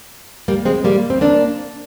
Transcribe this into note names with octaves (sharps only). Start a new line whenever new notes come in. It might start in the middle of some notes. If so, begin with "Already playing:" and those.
G3 A#3
G#3 C4
G3 A#3
C4
A#3 D4